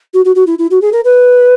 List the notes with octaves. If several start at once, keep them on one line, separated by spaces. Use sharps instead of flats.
F#4
F#4
F#4
E4
E4
F#4
G#4
A#4
B4